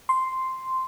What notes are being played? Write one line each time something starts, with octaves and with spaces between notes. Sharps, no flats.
C6